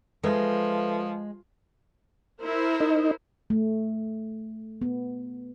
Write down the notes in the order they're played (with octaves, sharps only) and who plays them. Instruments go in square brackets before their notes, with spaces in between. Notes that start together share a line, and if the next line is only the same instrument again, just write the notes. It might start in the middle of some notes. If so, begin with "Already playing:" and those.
[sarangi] F3 [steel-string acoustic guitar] G#3 [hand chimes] A4 B4 E5
[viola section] E4 A#4 C5
[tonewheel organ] D#4
[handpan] A3
B3